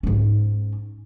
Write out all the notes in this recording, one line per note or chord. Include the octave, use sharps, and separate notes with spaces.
G#2 C#4